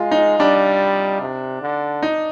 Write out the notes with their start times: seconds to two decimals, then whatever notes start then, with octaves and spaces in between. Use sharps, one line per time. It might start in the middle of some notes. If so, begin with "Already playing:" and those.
Already playing: G#3 F4
0.11 D#4
0.39 G3 D4
1.21 C3
1.62 D3
2.03 D#4